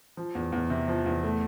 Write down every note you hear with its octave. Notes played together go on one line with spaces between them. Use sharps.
F3
E2
E2
C3
F3
E2
A3